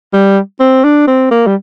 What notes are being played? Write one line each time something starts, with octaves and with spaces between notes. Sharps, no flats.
G3
C4
D4
C4
A#3
G3